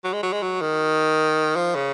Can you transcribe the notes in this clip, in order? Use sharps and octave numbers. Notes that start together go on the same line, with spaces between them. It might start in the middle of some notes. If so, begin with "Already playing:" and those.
F#3
G#3
F#3
G#3
F#3
D#3
F3
C#3